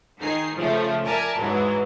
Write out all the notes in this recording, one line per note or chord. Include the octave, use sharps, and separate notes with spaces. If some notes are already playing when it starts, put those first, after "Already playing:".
D#3 D#4 G#4 C7
C#3 F3 A3
A#4 D5 E5 G#5 A5
G#2 E3 F#3 G#3